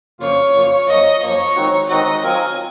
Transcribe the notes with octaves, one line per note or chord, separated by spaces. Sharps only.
F#2 C#3 F3 A#3 F4 C#5
F#2 C#3 F3 A#3 F4
F#2 F3 A#3 D#5
F#2 F3 A#3 C#5
D#3 G#3 C4 D#4 F#4
D#3 G#3 C4 D#4 F#4 D#5
F#3 C4 F4 A#4 D#5 G#5